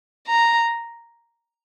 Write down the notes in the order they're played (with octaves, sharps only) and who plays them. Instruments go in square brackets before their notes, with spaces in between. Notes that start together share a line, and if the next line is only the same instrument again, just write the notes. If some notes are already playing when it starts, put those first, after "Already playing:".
[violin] A#5